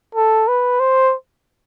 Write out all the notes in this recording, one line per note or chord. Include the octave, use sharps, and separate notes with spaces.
A4
B4
C5